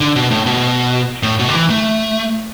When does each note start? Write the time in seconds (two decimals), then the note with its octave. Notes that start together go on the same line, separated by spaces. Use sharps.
0.01 D3
0.16 B2
0.31 A2
0.46 B2
1.23 A2
1.39 B2
1.49 D3
1.54 E3
1.70 A3